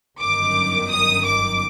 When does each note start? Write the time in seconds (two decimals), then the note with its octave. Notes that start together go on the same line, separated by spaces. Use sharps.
0.21 G1 F#2 D#3 D6
0.90 D#6
1.24 D6